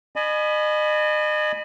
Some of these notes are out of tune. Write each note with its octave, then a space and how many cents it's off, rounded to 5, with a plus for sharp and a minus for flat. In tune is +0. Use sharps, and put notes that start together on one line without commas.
D#5 -35 G#5 +25 B5 +0